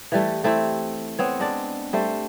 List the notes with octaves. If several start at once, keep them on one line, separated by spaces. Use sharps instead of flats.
E3 G3 A3
A3 C4 E4 G4
B3 C4 C#5
G#3 D4 D5
G3 A3 C5